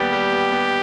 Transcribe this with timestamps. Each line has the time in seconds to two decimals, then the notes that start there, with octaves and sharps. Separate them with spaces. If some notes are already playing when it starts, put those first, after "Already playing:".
Already playing: D#2 G3 B3 G4
0.13 G3
0.32 B3
0.52 B3